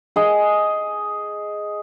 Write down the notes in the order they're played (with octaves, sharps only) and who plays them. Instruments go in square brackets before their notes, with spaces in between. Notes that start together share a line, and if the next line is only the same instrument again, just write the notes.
[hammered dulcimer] G#4 D#5